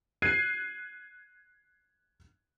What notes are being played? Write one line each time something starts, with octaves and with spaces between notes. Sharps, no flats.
F#6 G#6 C7 D#7